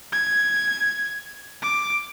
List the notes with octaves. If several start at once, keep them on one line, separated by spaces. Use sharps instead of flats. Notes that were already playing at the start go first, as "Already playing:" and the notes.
G#6
D6